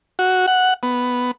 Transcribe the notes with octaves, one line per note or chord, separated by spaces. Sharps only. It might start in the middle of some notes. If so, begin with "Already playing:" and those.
F#4
F#5
B3